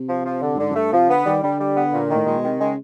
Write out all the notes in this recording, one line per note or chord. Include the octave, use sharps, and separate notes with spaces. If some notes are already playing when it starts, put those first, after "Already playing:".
Already playing: C3
F3
F3
D3
G2
G#2 D3
F#2
G2 A3
C3 F3
D3 B3
D#3 G3
D3 G3
G3
B3
A#2
D#3
A2
A#2 G#3
B2
D#3
C3
C#3 G#3